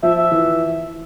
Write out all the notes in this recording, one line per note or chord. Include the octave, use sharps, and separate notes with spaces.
F3 E5
E5
E3